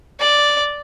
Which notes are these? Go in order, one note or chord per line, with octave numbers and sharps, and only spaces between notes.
D5